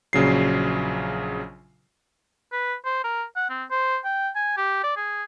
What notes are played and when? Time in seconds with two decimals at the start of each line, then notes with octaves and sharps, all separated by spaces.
0.13 A#1 C#3 F#3 C7
2.52 B4
2.85 C5
3.04 A#4
3.36 F#5
3.50 C4
3.71 C5
4.05 G5
4.36 G#5
4.57 G4
4.84 D5
4.97 G#4